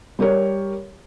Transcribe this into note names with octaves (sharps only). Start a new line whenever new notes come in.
G3 G4 A#4 C#5